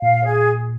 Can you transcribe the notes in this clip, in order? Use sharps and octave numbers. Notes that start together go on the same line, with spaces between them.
A#2 F5
G#4